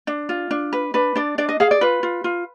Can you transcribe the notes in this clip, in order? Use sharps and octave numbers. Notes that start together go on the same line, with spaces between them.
D4
F4
D4
B4
D4 B4
D4 D5
D4 D5
D#5
G#4 F5
D5
F4 B4
F4
F4